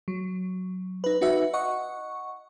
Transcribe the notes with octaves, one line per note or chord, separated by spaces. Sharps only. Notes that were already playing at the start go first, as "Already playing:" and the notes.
F#3
D#4 B4
D#4 F#4 B4 E5
D#5 F#5 C#6